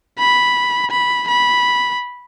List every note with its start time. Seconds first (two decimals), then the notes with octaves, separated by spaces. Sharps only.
0.18 B5
0.91 B5
1.28 B5